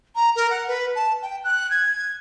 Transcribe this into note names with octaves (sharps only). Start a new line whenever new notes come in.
A#5
A#4
F#5
B4
A5
G5
F#6
G#6